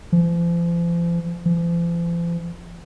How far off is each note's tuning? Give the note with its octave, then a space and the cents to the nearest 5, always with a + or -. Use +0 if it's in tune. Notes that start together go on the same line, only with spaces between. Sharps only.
F3 -40
F3 -45